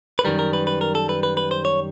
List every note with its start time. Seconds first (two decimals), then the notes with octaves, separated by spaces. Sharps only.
0.19 B4
0.25 F#2 D#3 G3 A#4
0.39 A#4
0.53 B4
0.67 B4
0.81 A#4
0.95 A4
1.09 B4
1.23 B4
1.37 B4
1.51 C5
1.65 C#5